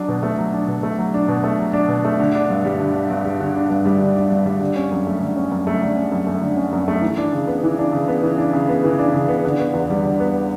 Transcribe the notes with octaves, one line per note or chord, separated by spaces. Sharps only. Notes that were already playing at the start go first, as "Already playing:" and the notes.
Already playing: F#3 D4
B2
A3
F#3
D4
B2
A3
F#3
D4
B2
A3
F#3
D4
B2
A3
D3
D4
G2
G3
D3
D4
G2
G3
D3
D4
G2
G3
D3
D4
G2
G3
D3
C#4
F#2
A3
D3
C#4
F#2
A3
D3
C#4
F#2
A3
D3
C#4
F#2
A3
E3
D4
C#3
B3
E3
D4
C#3
B3
E3
D4
C#3
B3
E3
D4
C#3
B3
D3
B3
E2
G3
D3
B3